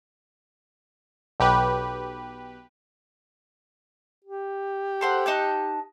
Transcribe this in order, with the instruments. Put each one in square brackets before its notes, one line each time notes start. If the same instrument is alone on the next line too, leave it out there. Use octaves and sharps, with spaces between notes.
[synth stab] B1 G4 B4
[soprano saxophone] G4
[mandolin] A4 C5 F#5
D#4 A5 F#6